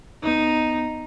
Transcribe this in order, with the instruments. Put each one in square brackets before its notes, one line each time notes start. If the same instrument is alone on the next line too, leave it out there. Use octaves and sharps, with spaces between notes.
[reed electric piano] D2 B3 [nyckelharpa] D#4